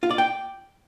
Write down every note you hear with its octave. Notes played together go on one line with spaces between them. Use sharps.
F4
D5
G5